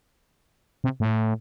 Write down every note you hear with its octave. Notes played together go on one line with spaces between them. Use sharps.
C3
A2